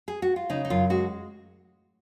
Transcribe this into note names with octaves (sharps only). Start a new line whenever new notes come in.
G#4
F#4
F4
C#3 D#4
D#4
F#2 F4
G#3 F#4